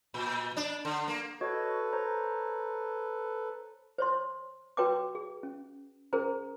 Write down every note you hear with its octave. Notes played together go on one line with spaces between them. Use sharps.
A#2
D4
D3
A#3
F#4 A4 B4 C#5 D#5
C5 C#5 A#5
C5 C#5 C6
F#4 B4 C#5 G5 A5 D6
G#4
C#4
C#4 G#4 A#4 C5 A#5